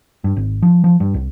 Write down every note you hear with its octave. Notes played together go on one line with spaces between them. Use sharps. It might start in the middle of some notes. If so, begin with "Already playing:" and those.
G2
G#1
F3
F3
G2
C2